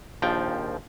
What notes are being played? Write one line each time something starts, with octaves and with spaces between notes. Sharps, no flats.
A#1 D#2 F3 G5